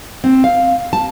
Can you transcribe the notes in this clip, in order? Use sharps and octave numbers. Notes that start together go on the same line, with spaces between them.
C4
F5
A5